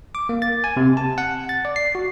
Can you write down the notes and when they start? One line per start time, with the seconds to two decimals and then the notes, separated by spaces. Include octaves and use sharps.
0.15 D6
0.29 A#3
0.42 A6
0.64 G#5
0.77 C3
0.97 A5
1.18 F#5
1.49 A6
1.65 D5
1.76 C7
1.95 F#4